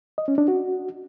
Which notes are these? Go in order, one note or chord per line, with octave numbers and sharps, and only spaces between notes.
D#5
C#4
D4
F#4